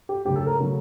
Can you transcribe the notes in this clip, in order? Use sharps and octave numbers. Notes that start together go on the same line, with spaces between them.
G4
D2 C#3 F#3 A3 G4
A4
A#4
C#3 F#3 A3